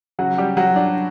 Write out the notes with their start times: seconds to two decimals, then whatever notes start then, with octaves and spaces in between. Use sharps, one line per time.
0.19 C#3 F#3 F#4
0.38 G3 G4
0.57 F#3 G3 F#4
0.76 D4